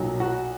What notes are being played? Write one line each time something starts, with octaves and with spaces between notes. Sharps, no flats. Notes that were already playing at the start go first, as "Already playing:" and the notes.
Already playing: B1 A#2 F#3
F#4